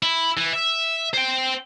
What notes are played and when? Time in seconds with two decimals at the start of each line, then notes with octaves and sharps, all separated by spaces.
0.03 E4
0.37 E3
0.53 E5
1.13 C5 G5